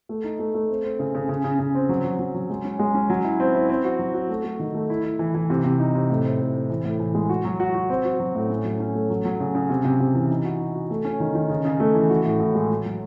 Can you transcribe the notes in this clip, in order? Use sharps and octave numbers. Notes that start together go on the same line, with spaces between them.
A3
D#4
A3
A3
C4
C4
C#3
C#3
C#3
C#3
C#3
C4
F#3
F#3
F#3
F#3
G#3
C#4
G#3
C#4
F#3
E4
C4
E4
C4
F#4
F#3
F#4
A3
A3
D#3
A3
E4
E4
E3
E3
C3
C3
D#4
C3
A2
C4
A2
C4
E3
A2
E3
G#3
F#4
F#3
F#4
F#4
C4
F#4
F#3
A2
C#4
F#3
C#4
A3
F#3
F#3
C#3
C#3
C3
C3
C3
E3
D#4
F#4
D#4
F#4
A3
C#4
D#3
D#3
C#3
C#3
A3
E3
F#4
A2
A2
G#3
F#4
F#3